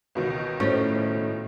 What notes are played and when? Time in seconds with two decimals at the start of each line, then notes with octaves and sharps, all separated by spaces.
0.15 C#2 B2 D#3
0.60 A2 C#4 F4 C5 C#5